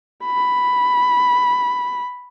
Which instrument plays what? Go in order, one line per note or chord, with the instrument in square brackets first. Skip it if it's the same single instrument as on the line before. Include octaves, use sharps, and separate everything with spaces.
[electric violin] B5